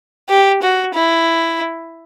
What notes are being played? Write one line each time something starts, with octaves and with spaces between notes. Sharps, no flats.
G4
F#4
E4